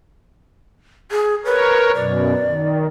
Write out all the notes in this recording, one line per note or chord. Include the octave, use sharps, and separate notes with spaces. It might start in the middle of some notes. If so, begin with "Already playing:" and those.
G#4
A#4 B4 C#5
F#2 B2 D5
D#3